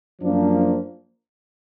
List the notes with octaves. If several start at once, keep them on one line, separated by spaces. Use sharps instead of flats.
F#2 F3 A#3 D4